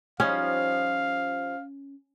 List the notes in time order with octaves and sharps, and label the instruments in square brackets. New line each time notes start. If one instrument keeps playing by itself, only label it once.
[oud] F3 G3 D#4 [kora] C#4 [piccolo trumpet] F5